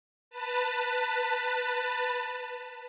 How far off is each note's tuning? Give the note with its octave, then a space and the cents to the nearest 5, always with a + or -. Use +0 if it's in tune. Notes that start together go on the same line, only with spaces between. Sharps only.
B4 +0 A5 +25